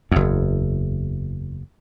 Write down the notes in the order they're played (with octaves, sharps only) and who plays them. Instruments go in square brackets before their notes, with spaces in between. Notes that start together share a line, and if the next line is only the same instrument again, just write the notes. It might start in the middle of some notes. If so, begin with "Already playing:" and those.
[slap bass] F#1 E2